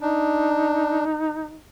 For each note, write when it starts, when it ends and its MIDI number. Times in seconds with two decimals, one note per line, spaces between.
0.01 1.05 62
0.01 1.60 63